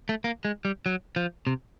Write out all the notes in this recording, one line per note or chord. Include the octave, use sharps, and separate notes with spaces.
A3
A#3
G#3
G3
F#3
F3
C3